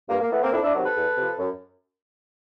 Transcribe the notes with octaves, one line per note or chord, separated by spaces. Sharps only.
G2 A#3
A#3
E3 A3 B3
A#3 C4
F2 D4 E4
D4 E4
C3 D#3 F#3
A4 B4
E2
C3 F3
F#2